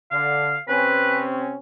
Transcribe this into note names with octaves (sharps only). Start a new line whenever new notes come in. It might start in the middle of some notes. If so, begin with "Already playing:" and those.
D3 F5
C3 C4 C#4 B4